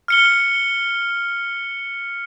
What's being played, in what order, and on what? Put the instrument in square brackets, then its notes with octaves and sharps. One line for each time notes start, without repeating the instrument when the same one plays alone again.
[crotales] F6 C#7 G7